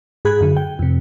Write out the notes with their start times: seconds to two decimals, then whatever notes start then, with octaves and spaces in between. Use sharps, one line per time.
0.25 G#2 G#4 B5 F#6 G#6
0.41 F#2 D3
0.57 G5
0.79 F2 C3